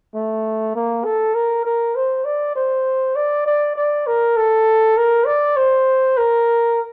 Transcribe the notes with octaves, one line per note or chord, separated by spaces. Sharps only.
A3
A#3
A4
A#4
A#4
C5
D5
C5
D5
D5
D5
A#4
A4
A#4
D5
C5
A#4